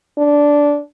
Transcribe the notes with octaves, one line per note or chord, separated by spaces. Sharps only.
D4